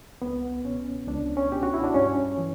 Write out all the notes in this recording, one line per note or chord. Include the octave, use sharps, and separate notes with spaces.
C#2 B3
B2 C#4
C#2 D4
C#4
B2 G4
F#4
E4
D4
G2 C#4
E3